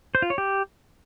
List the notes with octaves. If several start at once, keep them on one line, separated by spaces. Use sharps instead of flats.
C5
F4
C#5
G4